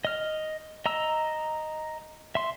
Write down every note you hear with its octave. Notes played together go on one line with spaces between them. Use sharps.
D#5 F6
D#5 A#5 E6
E5 C6